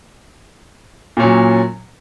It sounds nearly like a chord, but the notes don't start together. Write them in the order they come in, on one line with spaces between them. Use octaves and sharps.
A#2 C#4 F#3